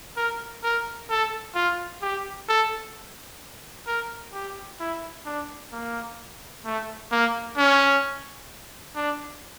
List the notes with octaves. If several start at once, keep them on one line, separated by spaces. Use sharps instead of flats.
A#4
A#4
A4
F4
G4
A4
A#4
G4
E4
D4
A#3
A3
A#3
C#4
D4